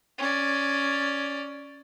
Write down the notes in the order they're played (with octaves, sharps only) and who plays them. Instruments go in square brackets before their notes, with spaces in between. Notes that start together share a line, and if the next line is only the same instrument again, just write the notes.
[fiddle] C#4 D5